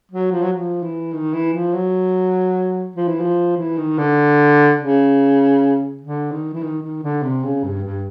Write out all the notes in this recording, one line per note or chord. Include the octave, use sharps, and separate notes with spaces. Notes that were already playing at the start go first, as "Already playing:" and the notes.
F#3
F3
F#3
F3
E3
D#3
E3
F3
F#3
F3
E3
F3
E3
D#3
D3
C#3
D3
D#3
E3
D#3
D#3
D3
C3
C#3
G2
G2